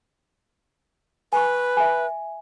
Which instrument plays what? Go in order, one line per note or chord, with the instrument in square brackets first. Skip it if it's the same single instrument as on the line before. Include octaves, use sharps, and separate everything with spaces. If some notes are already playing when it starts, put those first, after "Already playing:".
[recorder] B4 [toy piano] G#5 C#6
[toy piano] E5 G#5